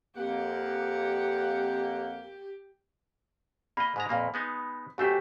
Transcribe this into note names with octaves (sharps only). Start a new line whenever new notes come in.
F2 A#3 G4 F#5
A#3 D#5 B5
G#2 G#3 A#5
F2 A#2 A#3
G#3 B3 D#4
F#2 A3 F#4 G4 C5 B6